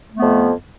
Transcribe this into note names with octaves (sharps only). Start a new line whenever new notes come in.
F2 A3 B3